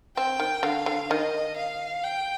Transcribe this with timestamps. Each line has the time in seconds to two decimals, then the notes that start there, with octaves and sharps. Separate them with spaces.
0.17 C4 G5
0.40 D#3
0.63 D3 F5
0.86 D3
1.10 D#3 D#5
1.56 F5
2.04 G5